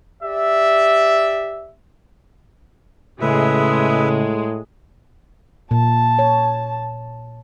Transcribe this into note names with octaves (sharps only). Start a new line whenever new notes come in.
G4 D5 E5
A2 C#3 G#3 B4 E5
A#2 A5
C#5